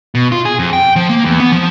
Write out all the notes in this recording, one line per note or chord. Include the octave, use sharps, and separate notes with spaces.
B2
F4
G#4
F2
G5
F3
A#3
E2
B3
F3